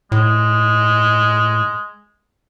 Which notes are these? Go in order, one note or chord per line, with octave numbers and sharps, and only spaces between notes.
A2 G#3